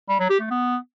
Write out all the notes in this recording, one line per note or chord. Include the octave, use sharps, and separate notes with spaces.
G3
F#3
G4
A3
B3